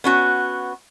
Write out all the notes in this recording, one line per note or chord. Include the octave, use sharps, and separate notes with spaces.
B3 C#4 F#4